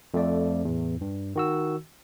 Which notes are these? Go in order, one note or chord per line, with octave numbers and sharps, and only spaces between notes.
F2 A3 D5
E2 A2
G2
D#3 F#4 E6